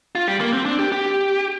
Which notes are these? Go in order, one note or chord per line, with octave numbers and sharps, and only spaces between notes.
F4
G3
A#3
C4
D4
G4
G4